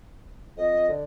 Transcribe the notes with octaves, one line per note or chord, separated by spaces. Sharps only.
F2 D#5
D3